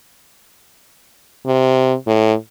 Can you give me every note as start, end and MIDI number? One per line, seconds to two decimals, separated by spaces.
1.46 1.94 48
2.07 2.34 45